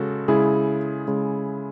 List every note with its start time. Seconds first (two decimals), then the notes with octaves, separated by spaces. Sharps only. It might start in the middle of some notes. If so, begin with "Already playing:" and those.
Already playing: C#3 G#3 F#4 A4
0.28 C#3 G#3 E4 G#4
1.08 C#3 G#3